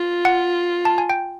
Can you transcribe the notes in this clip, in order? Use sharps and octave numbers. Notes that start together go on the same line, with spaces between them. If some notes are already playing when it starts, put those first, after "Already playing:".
Already playing: F4
F#5
A5
G#5
G5